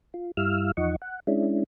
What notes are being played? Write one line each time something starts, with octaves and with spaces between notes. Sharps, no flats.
F4
G2 G3 E4 F5 E6 F6
E2 F3 D#4 D#5 F#5 C#6
F#5
G#3 C#4 D4 E4